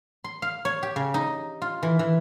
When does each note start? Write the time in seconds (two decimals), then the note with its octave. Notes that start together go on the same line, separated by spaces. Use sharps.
0.24 C6
0.42 F5
0.65 C#5
0.83 G4
0.96 C#3
1.14 D#4
1.62 F4
1.83 E3
1.99 E3